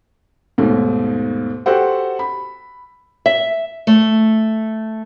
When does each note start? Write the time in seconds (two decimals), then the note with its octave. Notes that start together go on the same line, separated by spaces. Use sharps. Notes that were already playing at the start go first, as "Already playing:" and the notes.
0.58 D#2 G#2 B2 A3
1.66 F#4 G4 A4 C5 F#5
2.19 B5
3.26 E5
3.87 A3